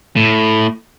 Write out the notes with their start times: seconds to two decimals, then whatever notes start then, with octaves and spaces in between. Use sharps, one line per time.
0.16 A2